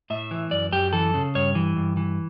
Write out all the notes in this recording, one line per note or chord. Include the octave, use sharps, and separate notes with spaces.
A2 E5
E3
F#2 D5
F#2 G4
E3 A4
C#3
G2 C#5
E3
G2
E3